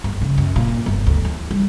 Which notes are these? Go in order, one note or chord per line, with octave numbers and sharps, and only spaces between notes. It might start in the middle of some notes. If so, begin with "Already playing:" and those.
G1
C#3
F#2
A#2
G1
D2
E2
G3